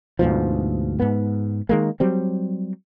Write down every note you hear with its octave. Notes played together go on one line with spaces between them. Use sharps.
D2 G#2 B2 F3
G#2 B3
D#3 G#3 A#3
F#3 G3 C4